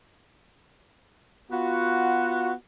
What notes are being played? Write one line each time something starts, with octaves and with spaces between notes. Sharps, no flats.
B3 F4 F#4